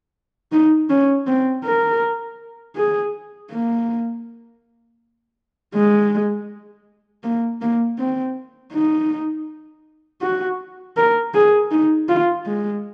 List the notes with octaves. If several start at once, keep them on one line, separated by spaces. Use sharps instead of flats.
D#4
C#4
C4
A#4
G#4
A#3
G#3
A#3
A#3
C4
D#4
F#4
A#4
G#4
D#4
F4
G#3